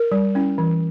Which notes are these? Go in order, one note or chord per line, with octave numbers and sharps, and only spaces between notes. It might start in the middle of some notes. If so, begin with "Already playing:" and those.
Already playing: A#4
G3
C#4 E4
E3